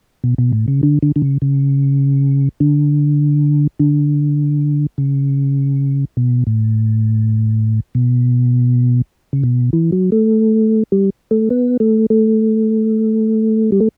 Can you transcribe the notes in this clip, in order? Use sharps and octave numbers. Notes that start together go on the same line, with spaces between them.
B2
B2
A2
C#3
D3
D3
D3
C#3
C#3
D3
D3
C#3
B2
A2
B2
C#3
B2
E3
F#3
A3
G3
A3
B3
A3
A3
G3
A3